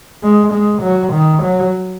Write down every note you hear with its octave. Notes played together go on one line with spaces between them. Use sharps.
G#3
G#3
F#3
D#3
F#3